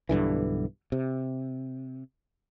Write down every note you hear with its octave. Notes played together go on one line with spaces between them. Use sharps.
B1 G2 D3 E3
C3